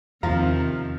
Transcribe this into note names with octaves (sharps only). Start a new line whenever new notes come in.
E2 C3 D#3 F3 F5 A#5